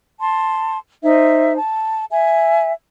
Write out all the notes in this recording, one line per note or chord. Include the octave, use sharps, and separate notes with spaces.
A5 C6
D#4 C5 E5
A5
E5 G#5